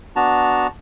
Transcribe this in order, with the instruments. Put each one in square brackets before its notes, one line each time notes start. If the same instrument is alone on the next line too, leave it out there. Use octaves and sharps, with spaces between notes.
[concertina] B3 D4 F#4 A5 A#5